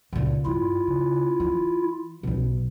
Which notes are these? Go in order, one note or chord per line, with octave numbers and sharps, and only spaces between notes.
C#2 A#2
G2 E4 F4
C#3
E3
B1 B2